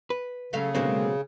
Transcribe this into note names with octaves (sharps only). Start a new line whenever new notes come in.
B4
C#3 F#3 A3 F5
B2 D3 F#3 G#3 A#3 C4